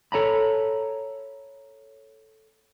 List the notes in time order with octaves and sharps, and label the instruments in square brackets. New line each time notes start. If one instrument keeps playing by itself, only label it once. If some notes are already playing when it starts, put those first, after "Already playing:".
[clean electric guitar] A4 C#5 A#5 B5